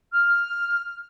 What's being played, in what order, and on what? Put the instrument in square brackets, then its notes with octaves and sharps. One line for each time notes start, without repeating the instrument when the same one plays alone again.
[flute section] F6